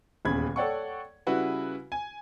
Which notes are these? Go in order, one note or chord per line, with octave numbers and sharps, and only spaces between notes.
D#1 E2 C#3 B5 G#6
A4 C#5 D5 F#5 G5 C#6
C#3 G3 E4 F#4 B4
G#5